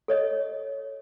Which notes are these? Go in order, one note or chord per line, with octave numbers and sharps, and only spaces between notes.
A4 C#5 D#5